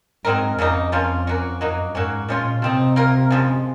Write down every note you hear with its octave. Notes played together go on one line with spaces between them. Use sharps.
G#2 F#3 C4 D#4 A#4
F2 C#3 F#3 A#3 D#4
F3 A#3 C#4 F4
A#3 C#4 F#4
F#2 F#3 A#3 D#4 F#4
G#2 F#3 A#3 C#4 F#4
A#2 F3 G#3 C#4 F4
C3 F3 C4 D#4
A#3 F4 A#4
C#3 F3 G#3